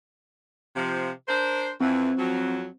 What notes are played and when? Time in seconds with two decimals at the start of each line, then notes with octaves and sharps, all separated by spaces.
0.76 C3 F3
1.28 D4 A#4 C5
1.81 F2 E3 C4
2.18 F2 F#3